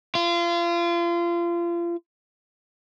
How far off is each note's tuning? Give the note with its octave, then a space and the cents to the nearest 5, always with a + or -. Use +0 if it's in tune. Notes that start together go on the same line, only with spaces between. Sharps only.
F4 -30